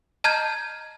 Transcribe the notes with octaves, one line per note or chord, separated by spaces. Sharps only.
D#5 A5 A#5 F6 G6 G#6